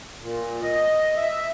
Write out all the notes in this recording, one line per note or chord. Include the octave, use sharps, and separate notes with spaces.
A#2
D#5
E5